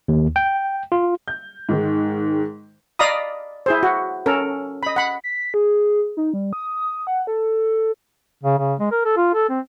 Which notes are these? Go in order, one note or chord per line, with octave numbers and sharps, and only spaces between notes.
D#2
G5
F4
G6
G#2 D#3 G#3
D5 D#5 F5 A#5 B5 D#6
E4 G#4 C5
F#4
C#4 A4 A#4
D#5 B5
F#5 B5
B6
G#4
D#4
G3
D#6
F#5
A4
C#3
C#3
G#3
A#4
A4
F4
A4
C4